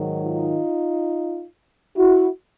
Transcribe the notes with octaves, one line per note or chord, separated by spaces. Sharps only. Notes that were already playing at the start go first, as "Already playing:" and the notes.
Already playing: G#2 D#3 F#3
D#4 F4
E4 F#4